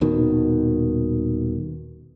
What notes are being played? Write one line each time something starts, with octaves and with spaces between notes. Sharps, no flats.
D#1 B2 D#3